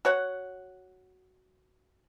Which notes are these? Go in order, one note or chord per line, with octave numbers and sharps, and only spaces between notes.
F#4 C#5 F#5